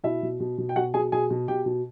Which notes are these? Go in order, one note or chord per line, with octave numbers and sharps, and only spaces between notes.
B2 E4 E5
B2
B2
B2
G5
B2 F#4 F#5
B2 G#4 G#5
B2 G#4 G#5
B2
B2 G4 G5
B2